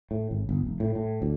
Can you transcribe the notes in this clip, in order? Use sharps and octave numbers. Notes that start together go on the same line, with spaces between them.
A2
G#1
G1
F1
A2
A2
D2